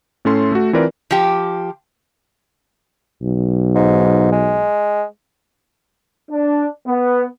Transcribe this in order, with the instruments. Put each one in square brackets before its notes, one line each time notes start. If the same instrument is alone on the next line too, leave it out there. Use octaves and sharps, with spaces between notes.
[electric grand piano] A2 A3 C#4 A4 C6
A3 F#4
E3 C4 F4 A#4 B4 D5
[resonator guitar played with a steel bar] F3 G4
[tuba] B1
[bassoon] G#2
G#3
[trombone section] D4
B3